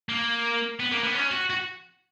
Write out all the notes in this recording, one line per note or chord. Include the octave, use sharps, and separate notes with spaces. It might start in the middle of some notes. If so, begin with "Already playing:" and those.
A#3
B3
A#3
B3
C#4
F#4
F#4